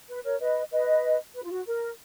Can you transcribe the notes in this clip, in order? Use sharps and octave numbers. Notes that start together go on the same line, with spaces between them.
B4
A#4 C#5
B4 D#5
B4 D#5
B4
F4
F#4
A#4